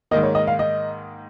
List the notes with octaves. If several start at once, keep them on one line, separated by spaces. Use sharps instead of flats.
G#2 D#3 A#3 D#5
C#5
D#5
F5
D#5